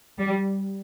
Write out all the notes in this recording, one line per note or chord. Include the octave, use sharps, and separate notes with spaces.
G3